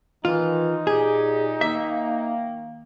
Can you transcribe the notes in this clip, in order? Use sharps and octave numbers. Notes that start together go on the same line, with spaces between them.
D#3 E3 D#4 F4
A#2 G4 G#4
D#3 A#3 E5